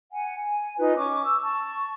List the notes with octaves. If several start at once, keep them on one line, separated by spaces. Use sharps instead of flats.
F#5 G#5
G#5
D#4 F4 B4
C#4 C#6 D6
E6
A5 C#6